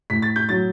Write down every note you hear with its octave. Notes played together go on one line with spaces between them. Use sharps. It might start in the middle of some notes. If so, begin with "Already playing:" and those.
A2 B6
A6
G6
F#3 A6